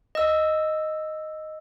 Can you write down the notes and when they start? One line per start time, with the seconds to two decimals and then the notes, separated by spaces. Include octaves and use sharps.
0.15 D#5 E6